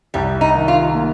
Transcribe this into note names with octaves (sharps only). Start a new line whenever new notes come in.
C2 G3
D#4
D#3
F4
A#3